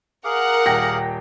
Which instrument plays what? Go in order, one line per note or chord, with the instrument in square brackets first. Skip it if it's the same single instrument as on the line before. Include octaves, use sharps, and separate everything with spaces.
[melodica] G#4 F5 D6 [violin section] A#4 F#5
[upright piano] D#1 G5 A#6